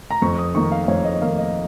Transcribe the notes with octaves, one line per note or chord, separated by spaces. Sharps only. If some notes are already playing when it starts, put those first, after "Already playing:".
A#5
F2 C#6
D#6
D#3 A#3 C#6
F5
F2 C#5
D#5
D#3 A#3 F5
D#5